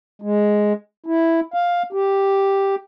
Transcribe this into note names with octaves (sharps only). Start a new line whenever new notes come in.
G#3
E4
F5
G4